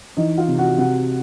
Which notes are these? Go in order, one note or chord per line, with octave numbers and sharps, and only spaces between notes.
E3 D#4 D#5
F4 F5
C3
F#4 F#5
C3 F#4 F#5